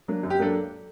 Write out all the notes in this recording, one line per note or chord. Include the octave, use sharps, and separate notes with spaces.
F#3 A#3 D4
F#2
G4
F#3 A#3 D4 A4